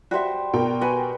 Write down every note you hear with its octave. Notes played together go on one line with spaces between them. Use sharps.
G3 F#4 C5 E5
B2 A#4 G5
F#4 B4 G#5